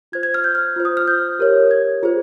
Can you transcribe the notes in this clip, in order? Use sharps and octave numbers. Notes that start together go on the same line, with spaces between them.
F4 C5 G#6
G#6
F6
G6
F6
F4 C5
D#6
F6
G6
G4 A#4 C#5
G#6
F4 G#4 C5